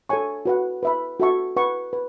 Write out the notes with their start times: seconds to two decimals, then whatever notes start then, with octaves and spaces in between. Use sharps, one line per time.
0.09 A4 C#5 G#5 C#6
0.45 F#4 B4 F#5
0.83 B4 E5 B5
1.20 F#4 A4 E5 A5 C#6
1.57 B4 F#5 C#6
1.93 B4